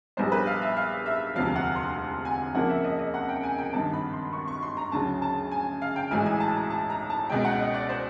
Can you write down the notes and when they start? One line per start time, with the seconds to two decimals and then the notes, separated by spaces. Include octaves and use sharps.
0.17 A#1 A#2 G3 B3 C5
0.32 B4
0.47 F5
0.62 E5
0.76 F5
1.06 E5
1.35 E1 D2 C3 F3 F5
1.55 F#5
1.76 C6
2.25 G#5
2.55 F2 C#3 F3 A#3 F#5
2.69 E5
2.84 D#5
2.99 D#5
3.14 F#5
3.29 G5
3.43 G#5
3.58 G5
3.73 G#1 G2 D#3 A5
3.93 B5
4.13 C6
4.33 C#6
4.48 C#6
4.63 C6
4.77 A#5
4.92 D2 C#3 F#3 A5
5.22 A5
5.51 G#5
5.82 F5
5.96 G5
6.11 B1 A2 E3 G#3 G#5
6.26 G#5
6.40 A5
6.56 A#5
6.70 A5
6.90 A#5
7.10 A5
7.29 C#2 B2 G#3 G5
7.45 F#5
7.59 D#5
7.74 D5
7.89 C5